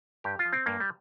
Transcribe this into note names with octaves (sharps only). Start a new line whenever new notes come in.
G2 G4
F4
F3
C4
G2 A#3
G3